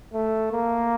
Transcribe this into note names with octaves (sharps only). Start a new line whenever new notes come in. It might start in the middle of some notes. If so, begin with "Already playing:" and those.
A3
A#3